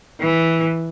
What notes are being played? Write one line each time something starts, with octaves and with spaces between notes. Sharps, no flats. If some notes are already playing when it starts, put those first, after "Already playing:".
E3